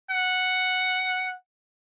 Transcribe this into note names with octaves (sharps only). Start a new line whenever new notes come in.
F#5